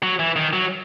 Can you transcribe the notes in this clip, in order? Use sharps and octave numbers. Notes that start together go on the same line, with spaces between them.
F#3
E3
D#3
F#3